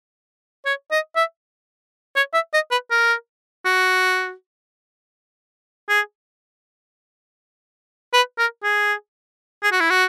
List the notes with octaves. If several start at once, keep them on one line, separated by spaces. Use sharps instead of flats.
C#5
D#5
E5
C#5
E5
D#5
B4
A#4
F#4
G#4
B4
A#4
G#4
G#4
F#4
E4
F#4